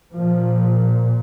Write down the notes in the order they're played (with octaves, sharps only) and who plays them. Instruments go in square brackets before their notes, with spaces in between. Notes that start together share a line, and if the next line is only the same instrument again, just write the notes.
[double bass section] A#2 F3